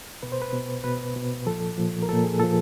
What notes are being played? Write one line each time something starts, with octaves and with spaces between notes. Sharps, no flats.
B2 B4
C5
B4
B2
B2 B4
B2
A#2 F3 A4
A#2 F3
A#4
A#2 F3 A4
G#4
A#2 F3 A4